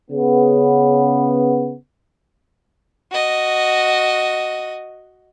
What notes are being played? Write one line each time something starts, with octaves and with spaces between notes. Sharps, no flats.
C#3 B3
F#4 D#5